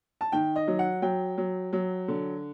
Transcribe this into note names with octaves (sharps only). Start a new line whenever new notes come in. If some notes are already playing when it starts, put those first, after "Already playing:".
A5
D#3 G5
D#5
F#3
F#5
F#3 G5
F#3
F#3
D3